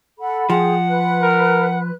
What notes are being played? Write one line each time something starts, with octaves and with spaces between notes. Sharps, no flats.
A4 F#5 B5
F3 G#4 F#5 G5
B4 F#6
A#4